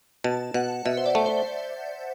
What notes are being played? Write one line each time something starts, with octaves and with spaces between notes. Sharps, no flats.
B2 A5
B2 F#5
B2 E5
C5
D5
A3
C5